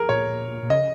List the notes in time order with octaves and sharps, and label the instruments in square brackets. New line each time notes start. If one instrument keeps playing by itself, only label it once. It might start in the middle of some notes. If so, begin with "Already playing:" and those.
Already playing: [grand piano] G#4 A#4
[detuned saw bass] A#2 [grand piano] C#5
[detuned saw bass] A#2
[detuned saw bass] C#3 [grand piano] D#5